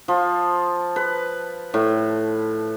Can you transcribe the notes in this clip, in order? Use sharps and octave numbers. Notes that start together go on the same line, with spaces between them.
F3
B4
A2